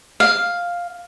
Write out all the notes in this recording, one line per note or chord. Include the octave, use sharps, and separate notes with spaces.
F5